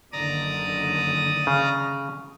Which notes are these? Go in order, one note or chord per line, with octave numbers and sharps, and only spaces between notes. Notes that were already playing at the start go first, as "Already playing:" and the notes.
F#1 D3 D#3 D5 A#5 D#6
C#3